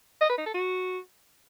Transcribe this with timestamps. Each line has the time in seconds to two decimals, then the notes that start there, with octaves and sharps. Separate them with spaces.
0.21 D#5
0.29 B4
0.38 D#4
0.46 A4
0.54 F#4